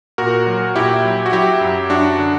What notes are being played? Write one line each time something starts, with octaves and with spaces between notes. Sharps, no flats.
A#2 F#4 A#4
F#3
A#2 E4 G4
F#3
F#4
F#3 E4 G4
F#2
F#2 D4 F#4
D3